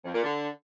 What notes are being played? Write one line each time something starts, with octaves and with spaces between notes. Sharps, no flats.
F2
A#2
D3